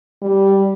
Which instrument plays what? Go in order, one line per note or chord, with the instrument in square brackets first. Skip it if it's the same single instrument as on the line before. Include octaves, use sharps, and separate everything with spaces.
[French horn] G3